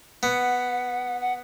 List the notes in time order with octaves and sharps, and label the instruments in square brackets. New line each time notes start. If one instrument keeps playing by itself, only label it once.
[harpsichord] B3 [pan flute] F#5
[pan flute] F#5